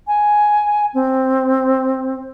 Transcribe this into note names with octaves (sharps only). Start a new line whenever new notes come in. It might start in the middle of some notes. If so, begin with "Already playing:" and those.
G#5
C4